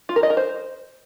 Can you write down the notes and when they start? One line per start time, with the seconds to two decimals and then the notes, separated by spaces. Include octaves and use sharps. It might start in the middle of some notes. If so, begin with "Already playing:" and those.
0.09 F4
0.16 A#4
0.23 D#5
0.30 A#4
0.37 C5